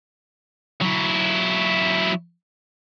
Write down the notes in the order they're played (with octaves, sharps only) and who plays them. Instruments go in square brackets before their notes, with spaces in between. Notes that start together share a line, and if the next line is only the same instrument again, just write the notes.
[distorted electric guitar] F#3 E4